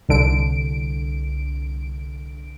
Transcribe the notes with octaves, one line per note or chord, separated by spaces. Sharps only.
C2 D3 D7